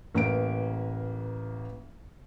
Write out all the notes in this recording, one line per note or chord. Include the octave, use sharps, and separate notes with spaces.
A1 A#3 B4 D7